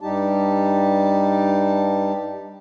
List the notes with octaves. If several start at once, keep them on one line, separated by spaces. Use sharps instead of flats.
G2 G3 D#4 G4 A5